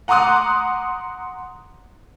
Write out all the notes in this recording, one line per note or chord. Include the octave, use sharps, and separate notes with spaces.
F#5 A#5 C6 D6 D#6 F#6